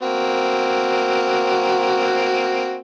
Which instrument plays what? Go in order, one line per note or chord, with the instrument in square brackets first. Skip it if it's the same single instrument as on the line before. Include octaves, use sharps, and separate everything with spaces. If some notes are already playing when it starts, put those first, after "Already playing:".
[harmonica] A#3 C4 F#4